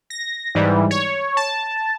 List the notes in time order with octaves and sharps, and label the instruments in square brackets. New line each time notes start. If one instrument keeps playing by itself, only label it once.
[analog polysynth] A#6
G#2 E3 G3
C#5
A5